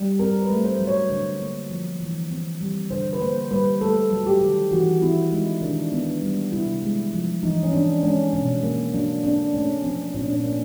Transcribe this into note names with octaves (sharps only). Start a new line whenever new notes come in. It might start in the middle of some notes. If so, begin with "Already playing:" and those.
Already playing: G3
C4 A#4
B4
A3
C5
F#3
C#5
D3
A#3
F3
E3
C4
G3
D3 C5
B4
A#3 C5
G3 B4
A3 A4
F#3
G4
D#3
E3 F#4
C4 E4
G#3 D#4
D#3 D4
B3
D4
G3
C3 E4
G#3
F3
E3 D#4
C#4
C4 D4
G#3 C#4
B2 C#4
A#3
F#3 D4
C4 D4
A3 C#4
F3 C4
A#2 C#4
D4
C#4
A#3